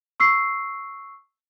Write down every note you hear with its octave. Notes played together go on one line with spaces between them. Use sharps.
C#6 E6 C7